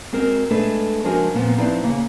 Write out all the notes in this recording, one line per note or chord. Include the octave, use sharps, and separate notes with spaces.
G#3 C4 F#4 A#4
G#3 A3 D4 A4 B4
F3 G#3 D4 F#4 A#4 G#5
A#2 F3 B3 C4
F3 C4 D#4 E4 B4 D5
C#3 A#3